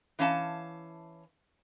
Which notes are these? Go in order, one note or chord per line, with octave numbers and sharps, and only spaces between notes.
E3 C#4 F5 A5